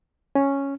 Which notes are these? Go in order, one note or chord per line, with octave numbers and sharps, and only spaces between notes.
C#4